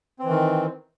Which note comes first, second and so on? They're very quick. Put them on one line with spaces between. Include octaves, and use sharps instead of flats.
C4 E3 D#3